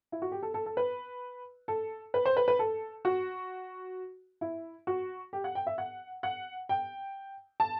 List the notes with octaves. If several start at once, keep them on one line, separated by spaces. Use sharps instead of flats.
E4
F#4
G4
A4
A4
A4
B4
A4
B4
C5
B4
B4
A4
F#4
E4
F#4
G4
F#5
G5
E5
F#5
F#5
G5
A5